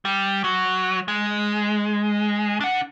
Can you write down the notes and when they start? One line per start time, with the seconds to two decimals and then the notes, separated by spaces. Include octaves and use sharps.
0.05 G3
0.44 F#3
1.08 G#3
2.60 D4 F#5